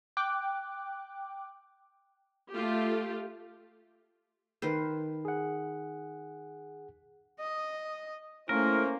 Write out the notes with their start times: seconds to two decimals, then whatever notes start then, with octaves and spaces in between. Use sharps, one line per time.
0.17 G5 D6 F#6
2.53 A3 F4 G4
4.62 D#3 B4 C5
5.25 G#4 F#5
7.40 D#5
8.49 A3 A#3 C#4 E4 A#4 C5